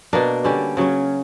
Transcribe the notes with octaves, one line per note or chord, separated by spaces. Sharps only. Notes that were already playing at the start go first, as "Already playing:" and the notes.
B2 A#3 D4 A#4
D3 G3 C#4 G4
C#3 F#3 C#4